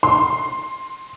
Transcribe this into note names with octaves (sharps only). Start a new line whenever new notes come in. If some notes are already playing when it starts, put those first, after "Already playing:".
C6